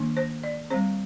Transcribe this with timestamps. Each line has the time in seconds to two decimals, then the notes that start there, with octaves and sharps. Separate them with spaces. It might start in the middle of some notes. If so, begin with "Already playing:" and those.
Already playing: D#3 A#3 D4
0.17 C5
0.43 D5
0.70 G3 C4 C5